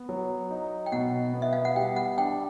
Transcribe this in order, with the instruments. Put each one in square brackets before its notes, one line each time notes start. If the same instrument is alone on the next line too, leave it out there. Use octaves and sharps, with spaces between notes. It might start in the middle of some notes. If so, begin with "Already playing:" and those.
Already playing: [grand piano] B3
F#3
D#4
[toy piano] G5
[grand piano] B2 [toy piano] F#5
[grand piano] B3
[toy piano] E5
F5
F#5
[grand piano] G3 [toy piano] G5
[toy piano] F#5
[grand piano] D4 [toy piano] G5